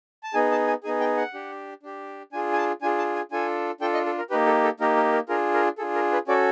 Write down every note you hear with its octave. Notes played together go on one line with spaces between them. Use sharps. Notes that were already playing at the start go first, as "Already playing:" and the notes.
A5
B3 D#4 G#4 G#5
A5
G#5
B3 D#4 G#4 G#5
G5
F#5
D4 G4
D4 G4
D4 F4 G#4 G#5
G#5
A5
D4 F4 G#4 G#5
A5
G#5
D4 F4 A4 G#5
D4 F4 A4 G5
D#5
A4
A#4
A#3 D#4 G4 B4
A4
A4
A#3 D#4 G4 A#4
A#4
A#4
D4 F4 G#4 A#4
A#4
D4 F4 G#4 A4
A#4
B4
C#4 F#4 A4 D5